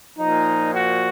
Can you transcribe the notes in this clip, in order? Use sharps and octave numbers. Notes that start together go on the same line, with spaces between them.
A#2 F3 D#4
F#4